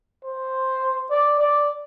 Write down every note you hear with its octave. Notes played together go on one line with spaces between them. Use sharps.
C5
D5
D5